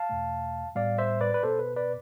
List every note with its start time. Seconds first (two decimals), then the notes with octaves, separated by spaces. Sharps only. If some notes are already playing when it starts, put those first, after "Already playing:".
Already playing: F5 A5
0.09 E2 B2 A3
0.75 A2 G3 B3 D5 F5
0.98 C5 E5
1.21 B4 D5
1.34 B4
1.43 B2 B3 A4 C5
1.59 B4
1.76 B4 D5